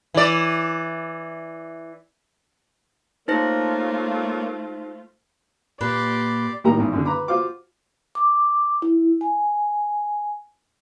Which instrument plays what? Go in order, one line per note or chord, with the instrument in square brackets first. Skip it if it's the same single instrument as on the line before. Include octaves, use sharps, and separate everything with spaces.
[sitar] E3 D5
[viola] A3 F4 [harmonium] A#3 A#4 C#5 [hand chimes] D#4 C5 A#6
[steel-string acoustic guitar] A#2 [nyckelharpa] G4 C6 [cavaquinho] B4 [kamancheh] D5
[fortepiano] A2 D#3 G3 A#3 G4 A#5
G#1 E2
F#2 D3
B4 A#5 B5 D6
F4 F#4 C5 F5 D6
[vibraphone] D6
E4
G#5